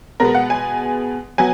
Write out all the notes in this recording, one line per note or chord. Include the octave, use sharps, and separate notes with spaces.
B2 G#3 B3 A#4
F#5
G#5
F#3 B3 G#5